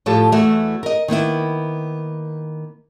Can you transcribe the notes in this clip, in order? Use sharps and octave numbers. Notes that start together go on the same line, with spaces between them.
A2 F3 G4 A4 A5
E2 E3 A3 F#4 E5
A#4 D#5
D#3 A#3 B3 E4